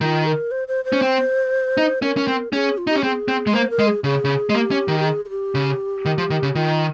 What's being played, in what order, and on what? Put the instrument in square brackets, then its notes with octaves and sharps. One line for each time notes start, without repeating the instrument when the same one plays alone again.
[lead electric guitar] D#3 [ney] F4
[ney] A#4
C5
C5
C5
[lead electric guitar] C#4
C4
D#4
[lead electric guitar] C#4 [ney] A#4
[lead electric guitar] C#4
C4
[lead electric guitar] C#4 [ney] G#4
[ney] F4
[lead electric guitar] D#4
[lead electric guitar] C#4 [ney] G4
[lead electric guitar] C4 [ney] G#4
[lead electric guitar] C4
G#3
[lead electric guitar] A#3 [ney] C5
[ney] A#4
[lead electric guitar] G#3
[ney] G#4
[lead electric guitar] C#3 [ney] G#4
[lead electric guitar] C#3
G#3
[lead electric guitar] A#3 [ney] G4
[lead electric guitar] C#4
D#3
[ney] G4
G#4
G#4
G4
[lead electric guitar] C#3
D#3
F3
D#3
C#3
[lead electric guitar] D#3 [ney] F4